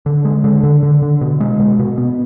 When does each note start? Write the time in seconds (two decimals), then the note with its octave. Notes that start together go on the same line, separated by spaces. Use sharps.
0.06 D3
0.25 G#3
0.44 D3
0.63 D3
0.83 D3
1.02 D3
1.21 B2
1.40 G#3
1.60 B2
1.79 B2
1.98 B3